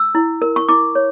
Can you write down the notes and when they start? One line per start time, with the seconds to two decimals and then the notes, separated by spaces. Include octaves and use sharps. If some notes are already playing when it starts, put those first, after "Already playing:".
Already playing: E6
0.15 E4
0.42 A#4
0.56 C#6
0.69 E4 D6
0.95 C#5